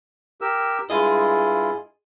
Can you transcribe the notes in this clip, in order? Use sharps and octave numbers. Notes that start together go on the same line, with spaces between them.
G4 A#4 E6
G2 E4 F4 G#4 D#5